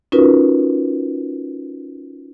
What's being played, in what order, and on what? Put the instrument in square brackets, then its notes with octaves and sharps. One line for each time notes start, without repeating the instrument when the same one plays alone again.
[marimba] C#4 D#4 F4 F#4 A#4 B4